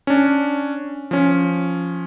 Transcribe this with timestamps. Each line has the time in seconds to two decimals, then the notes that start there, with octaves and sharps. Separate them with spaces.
0.07 C#4 D4
1.11 F3 C#4